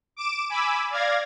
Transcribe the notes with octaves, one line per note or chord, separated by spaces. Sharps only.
D6 D7 E7
G#5 B5 D6 E6
D5 F5 G#6 A#6